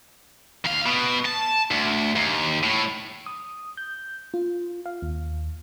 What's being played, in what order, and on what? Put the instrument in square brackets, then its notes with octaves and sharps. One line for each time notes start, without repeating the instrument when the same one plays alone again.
[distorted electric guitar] D#2 F5
B2
A5
D2
D#2
A2
[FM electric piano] D#6
G6
F4
F5
D#2